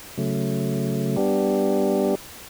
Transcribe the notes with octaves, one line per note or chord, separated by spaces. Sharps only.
C#3 F#3 A3
G3 B3 D4 G4